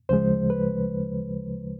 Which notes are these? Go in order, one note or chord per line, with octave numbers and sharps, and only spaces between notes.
D2 C#3 F3 G#3 C5
B4